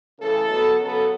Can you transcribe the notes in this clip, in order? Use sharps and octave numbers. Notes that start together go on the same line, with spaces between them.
C#3 E3 A3 A4
B2 F#3 B3
C#3 F#3 B3 A4